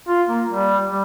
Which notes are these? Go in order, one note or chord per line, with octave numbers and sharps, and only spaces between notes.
F4
A#3
G3
G3